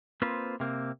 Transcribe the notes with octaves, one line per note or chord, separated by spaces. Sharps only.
A#3 C4 F4 B4 C5
C3 A#3 C4